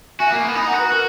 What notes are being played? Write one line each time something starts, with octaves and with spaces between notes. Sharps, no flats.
F#4 E5 G#5
A#3
B3
D#4 G#5 B5
F#5 A#5
F#4
B4
F#4 A#4